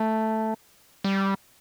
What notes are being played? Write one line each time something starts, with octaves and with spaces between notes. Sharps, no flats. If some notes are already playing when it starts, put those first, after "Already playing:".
Already playing: A3
G3